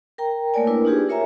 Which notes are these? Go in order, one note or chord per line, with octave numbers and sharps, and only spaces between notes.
A#4 G5 A#5
A3 A#3 A#4 C#5 D5 G#5
D4 E4 A#4 B4
D4 D#4 F4 G4 G#4 B4
A#4 C#5 E5 G#5 A#5